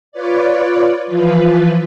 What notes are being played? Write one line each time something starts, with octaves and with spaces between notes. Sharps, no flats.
F4 B4 C#5 D5
E3 F3 F4 B4